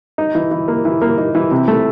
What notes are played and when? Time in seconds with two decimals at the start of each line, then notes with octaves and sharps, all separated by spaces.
0.18 D#4
0.35 E3
0.51 E3
0.68 A#3
0.85 E3
1.02 A#3
1.18 D#4
1.35 E3
1.51 C3
1.68 A3